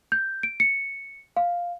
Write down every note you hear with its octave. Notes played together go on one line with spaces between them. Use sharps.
G6
D7
C#7
F5